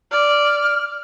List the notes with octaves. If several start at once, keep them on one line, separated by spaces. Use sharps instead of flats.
D5 F6